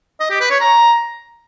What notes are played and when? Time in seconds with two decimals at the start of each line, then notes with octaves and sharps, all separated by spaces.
0.20 D#5
0.30 G4
0.40 B4
0.51 C#5
0.61 A#5